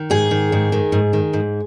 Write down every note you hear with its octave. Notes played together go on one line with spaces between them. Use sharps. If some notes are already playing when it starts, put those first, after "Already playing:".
Already playing: D#3
G#2 G#4
D#3
G#2
D#3
G#2
D#3
G#2